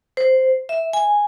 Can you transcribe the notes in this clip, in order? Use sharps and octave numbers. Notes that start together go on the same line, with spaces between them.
C5
E5
G#5